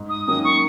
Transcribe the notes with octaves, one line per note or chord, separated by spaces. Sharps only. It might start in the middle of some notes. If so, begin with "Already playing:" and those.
Already playing: G#2
D#6
D#3 F#3 A#3 C#4 D#6
C#6